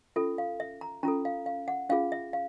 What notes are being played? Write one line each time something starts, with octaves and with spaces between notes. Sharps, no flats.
C#4 F4 A4 E5
F5
E5
A#5
C#4 F4 A4 A#5
F5
F5
F#5
C#4 F4 G#4 F5
E5
F5